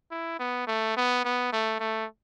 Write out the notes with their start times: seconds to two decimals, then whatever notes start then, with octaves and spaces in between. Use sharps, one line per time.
0.11 E4
0.39 B3
0.67 A3
0.97 B3
1.25 B3
1.53 A3
1.80 A3